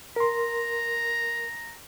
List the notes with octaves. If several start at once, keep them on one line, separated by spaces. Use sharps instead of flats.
A#4 A#5 C6